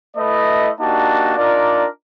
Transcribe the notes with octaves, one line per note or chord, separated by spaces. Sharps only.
A3 E4 B4 D#5
A#3 D4 D#4 F#4 G4 A5
D4 D#4 F4 A#4 D5